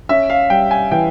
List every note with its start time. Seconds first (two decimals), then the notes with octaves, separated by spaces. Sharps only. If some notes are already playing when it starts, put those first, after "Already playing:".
0.09 C#4 E5
0.30 F5
0.50 G3 G5
0.71 G#5
0.91 E3 G5